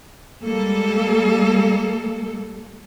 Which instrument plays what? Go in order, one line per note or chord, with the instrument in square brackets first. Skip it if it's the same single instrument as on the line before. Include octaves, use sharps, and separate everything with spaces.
[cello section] G3 G#3 A#3 A4